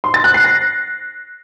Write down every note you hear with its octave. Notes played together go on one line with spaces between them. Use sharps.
C6
A6
F#6
C7
A#6